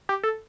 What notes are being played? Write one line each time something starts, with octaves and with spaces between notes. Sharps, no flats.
G4
A4